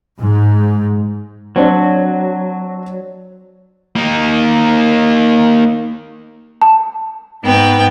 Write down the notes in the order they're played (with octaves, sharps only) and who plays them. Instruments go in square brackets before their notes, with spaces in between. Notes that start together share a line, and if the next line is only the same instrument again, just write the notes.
[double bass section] G#2
[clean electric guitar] F#3 [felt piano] C4 D4
[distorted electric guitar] A#3 D#4
[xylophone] A5
[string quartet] G#2 B3 G5